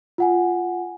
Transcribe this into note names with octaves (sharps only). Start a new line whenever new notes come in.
F4 F#5 G#5